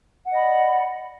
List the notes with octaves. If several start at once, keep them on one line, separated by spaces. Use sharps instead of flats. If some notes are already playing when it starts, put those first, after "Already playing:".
D5 D#5 F#5 B5